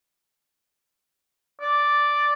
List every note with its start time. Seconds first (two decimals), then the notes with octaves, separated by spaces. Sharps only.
1.61 D5